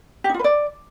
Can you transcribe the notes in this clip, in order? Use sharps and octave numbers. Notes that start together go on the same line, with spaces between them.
G4
D#4
F4
B4
D5